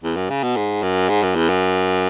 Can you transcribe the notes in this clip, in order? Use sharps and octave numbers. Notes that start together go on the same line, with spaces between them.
E2
F#2
C#3
B2
G#2
F#2
G#2
F#2
E2
F#2